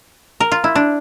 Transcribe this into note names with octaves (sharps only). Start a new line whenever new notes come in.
A#4
F4
E4
D4